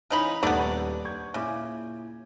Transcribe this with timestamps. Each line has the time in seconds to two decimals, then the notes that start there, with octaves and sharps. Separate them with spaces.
0.10 C#3 E3 C#4 D#4 B5
0.43 D#1 A3 B3 D4 D#4 D5
1.05 C#6 G6 G#6
1.34 A#2 C#3 E4 D6